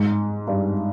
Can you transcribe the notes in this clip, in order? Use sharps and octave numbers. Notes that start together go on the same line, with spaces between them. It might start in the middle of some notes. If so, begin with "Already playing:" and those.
Already playing: G#2
G2